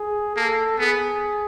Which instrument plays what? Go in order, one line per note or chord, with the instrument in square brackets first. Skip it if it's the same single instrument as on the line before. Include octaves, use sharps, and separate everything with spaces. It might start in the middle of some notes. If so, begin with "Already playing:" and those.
Already playing: [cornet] G#4
[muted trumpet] A#3 [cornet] A4
[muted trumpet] B3 [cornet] G#4